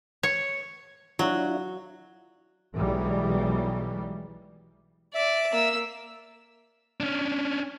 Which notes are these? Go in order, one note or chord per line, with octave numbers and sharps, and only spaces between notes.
C#5
F#3 D4 E4 F4
B1 B2 E3 G3 G#3
D5 E5
A#3 E6
C#4 D4